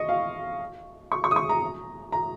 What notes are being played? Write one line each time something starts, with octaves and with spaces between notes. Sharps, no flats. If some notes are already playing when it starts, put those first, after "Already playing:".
Already playing: D#5 C#6
F5
C#6
C#6
D#6
C#6
A#5
A#5